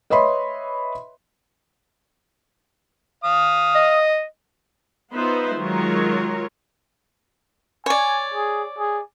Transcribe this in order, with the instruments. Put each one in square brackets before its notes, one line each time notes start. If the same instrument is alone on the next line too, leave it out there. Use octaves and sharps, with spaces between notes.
[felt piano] B4 C#5 D#5 E5 B5 C6
[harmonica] F5 D#6
[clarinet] D#5
[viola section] B3 D#4 F4 B4 C5 E5
D#3 F#3 G#3 F4 A#4 C#5
[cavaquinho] C#5 D5 [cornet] G#5
[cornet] G#4
G#4